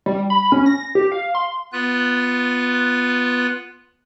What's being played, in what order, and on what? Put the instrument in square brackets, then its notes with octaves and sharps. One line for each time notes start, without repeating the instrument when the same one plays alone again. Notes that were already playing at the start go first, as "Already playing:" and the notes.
[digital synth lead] G3
B5
C#4
A#6
G4
F5
C6
[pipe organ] B3 F4 B4 F#6